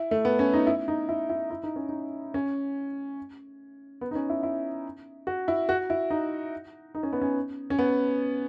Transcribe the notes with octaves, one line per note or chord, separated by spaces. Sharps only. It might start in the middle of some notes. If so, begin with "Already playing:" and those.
Already playing: E4
A3
B3
C#4
D#4
E4
D#4
E4
E4
E4
D#4
C#4
D#4
C#4
B3
D#4
C#4
E4
E4
F#4
E4
F#4
E4
D#4
D#4
C#4
B3
C#4
C#4
B3